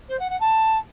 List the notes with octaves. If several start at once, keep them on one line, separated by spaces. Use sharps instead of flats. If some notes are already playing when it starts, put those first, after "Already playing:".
C5
F#5
F#5
A5